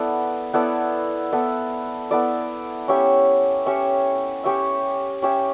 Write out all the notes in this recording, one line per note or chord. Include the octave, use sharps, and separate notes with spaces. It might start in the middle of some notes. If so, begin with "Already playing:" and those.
Already playing: B3 E4 A4 D5
B3 E4 A4 D5
B3 E4 A4 D5
B3 E4 A4 D5
C#4 G4 C#5 E5
C#4 G4 C#5 E5
C#4 G4 C#5 E5
C#4 G4 C#5 E5